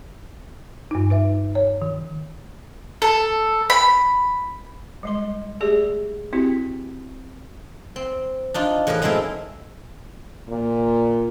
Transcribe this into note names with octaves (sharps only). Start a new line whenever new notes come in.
G2 D#4
D#4 B4 E5
C#5
D#3
A4
B5
G3 G#3 C6
A3 G4 G#4 D5
C4 E4 F#4 G4
C4
D4 D#4 F4
E2 A2 A#4 B4 D#5
F#2 G#3 A3 C4 E4 A#4
A#2